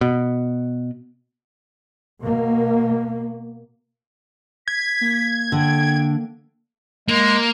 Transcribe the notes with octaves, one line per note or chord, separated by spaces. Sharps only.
B2
B2 A#3
G#6 B6
A#3
D3 G5
G#3 A#3